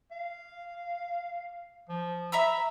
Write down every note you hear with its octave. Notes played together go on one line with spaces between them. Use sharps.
F5
F3
E5 A#5 B5 E6